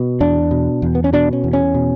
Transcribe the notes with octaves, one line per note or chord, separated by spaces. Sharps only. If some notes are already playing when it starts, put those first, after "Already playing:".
Already playing: B2
E2 D4
B2
E2
B3
C#4
B2 D4
C#4
E2
C#4
B2